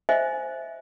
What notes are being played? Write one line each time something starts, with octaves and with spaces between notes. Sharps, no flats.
C5 D#5 E5 G#5